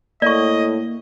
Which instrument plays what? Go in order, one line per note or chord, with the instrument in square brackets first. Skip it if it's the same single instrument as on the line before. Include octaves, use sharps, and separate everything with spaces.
[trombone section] A2 [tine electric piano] A#3 [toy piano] D5 C#6 [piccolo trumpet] D#5